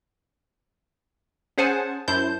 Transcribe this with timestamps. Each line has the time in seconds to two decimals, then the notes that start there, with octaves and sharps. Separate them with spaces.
1.58 C#4 G#4 C5 F#5 G#5 A5
2.08 F#2 E4 C5 A5 G6